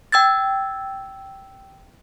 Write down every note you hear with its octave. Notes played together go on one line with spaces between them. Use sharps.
G5 E6 G#6 A6